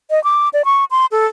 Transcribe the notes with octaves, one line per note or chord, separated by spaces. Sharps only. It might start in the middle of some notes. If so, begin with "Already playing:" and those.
D#5
D6
D5
C#6
C6
A4